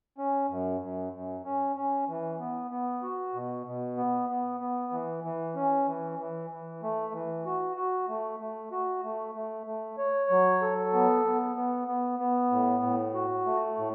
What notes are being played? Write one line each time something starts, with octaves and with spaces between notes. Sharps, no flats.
C#4
F#2
F#2
F#2
C#4
C#4
E3
B3
B3
F#4
B2
B2
B3
B3
B3
E3
E3
C#4
E3
E3
E3
A3
E3
F#4
F#4
A3
A3
F#4
A3
A3
A3
C#5
F#3
A4
B3
B3
B3
B3
B3
A2
A2
F#4
A3
A2